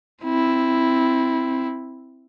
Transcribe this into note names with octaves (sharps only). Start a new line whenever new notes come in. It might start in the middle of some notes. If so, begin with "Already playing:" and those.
C4 E4